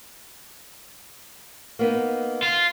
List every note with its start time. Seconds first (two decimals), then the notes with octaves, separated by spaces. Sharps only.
1.79 A#3 B3 D#4
2.43 F4